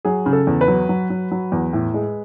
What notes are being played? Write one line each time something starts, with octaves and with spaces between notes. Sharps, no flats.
F#3 G#4
C#3
A4
E2
B4
F#3
F#3
F#3
F#3
E2
A2
G#3